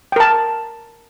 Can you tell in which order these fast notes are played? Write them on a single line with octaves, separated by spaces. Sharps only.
G5 A#4 A5